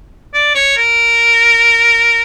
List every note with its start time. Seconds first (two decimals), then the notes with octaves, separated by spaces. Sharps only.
0.34 D5
0.55 C#5
0.77 A#4